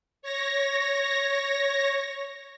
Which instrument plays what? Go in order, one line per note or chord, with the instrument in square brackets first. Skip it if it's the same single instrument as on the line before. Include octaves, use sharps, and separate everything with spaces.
[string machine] C#5 A#6